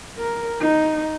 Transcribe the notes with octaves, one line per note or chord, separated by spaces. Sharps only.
A#4
D#4